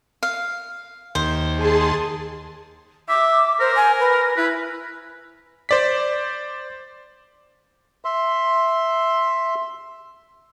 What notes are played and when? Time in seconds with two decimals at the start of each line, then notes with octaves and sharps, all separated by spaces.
0.23 F5
1.15 D#2 C5
1.56 G#4 A5 C6
3.09 E5 D6
3.60 A#4 C5
3.76 G#5
4.00 B4
4.37 E4 B4
5.69 C5 D5 B6
8.05 E5 C6